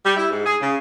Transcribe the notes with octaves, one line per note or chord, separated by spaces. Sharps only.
G3
E4
G#2
G#4
C#3